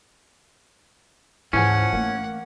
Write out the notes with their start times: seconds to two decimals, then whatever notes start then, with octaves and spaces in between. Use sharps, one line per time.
1.53 D2 G#2 E3 F3 C#4 G#4 F#5
1.93 E3 A3 A#3